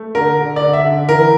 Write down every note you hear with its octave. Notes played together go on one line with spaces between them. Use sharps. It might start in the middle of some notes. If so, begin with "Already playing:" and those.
Already playing: A3
D3 A#4
D3
D5
D3
E5
D3
E3 A#4